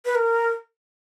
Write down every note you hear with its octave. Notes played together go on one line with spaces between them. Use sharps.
B4
A#4